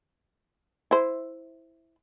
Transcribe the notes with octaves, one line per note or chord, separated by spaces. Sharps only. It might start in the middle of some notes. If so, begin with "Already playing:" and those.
E4 C5